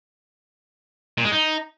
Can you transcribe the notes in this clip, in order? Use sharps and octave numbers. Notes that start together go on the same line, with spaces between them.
A#2
G#3
D#4